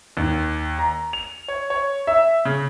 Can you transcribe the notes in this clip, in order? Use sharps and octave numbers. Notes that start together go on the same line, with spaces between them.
D#2
A#5
F7
C#5
C#5
E5
C#3